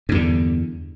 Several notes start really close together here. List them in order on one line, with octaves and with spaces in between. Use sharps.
G2 E2 D3